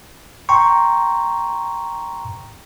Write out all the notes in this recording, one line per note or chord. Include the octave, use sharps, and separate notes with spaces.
G5 A#5 C6 C#6